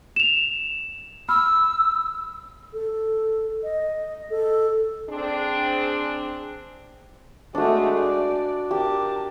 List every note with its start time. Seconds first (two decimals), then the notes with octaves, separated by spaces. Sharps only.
0.16 E7 F7
1.29 B5 E6 F6
2.73 A4
3.63 D#5
4.30 A4
5.09 C4 D4 G#4
7.55 G#3 A3 D4 F#4
7.98 D5
8.71 G4 A#4 A5